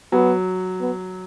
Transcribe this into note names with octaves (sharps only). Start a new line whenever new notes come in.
F#3 B3
B3